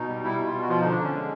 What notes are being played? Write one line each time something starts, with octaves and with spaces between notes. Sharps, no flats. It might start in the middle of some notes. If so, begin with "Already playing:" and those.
Already playing: B2 D#4
G3
G3 E4
B2
F4
B2
F#4
F3 F4
D3 D#4
D4
D3 C#4
G#3